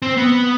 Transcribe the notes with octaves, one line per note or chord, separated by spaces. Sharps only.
C4
B3